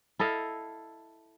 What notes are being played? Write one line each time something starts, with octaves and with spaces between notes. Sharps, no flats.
E4 A4 D#5 F5